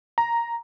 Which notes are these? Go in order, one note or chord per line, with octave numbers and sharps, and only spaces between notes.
A#5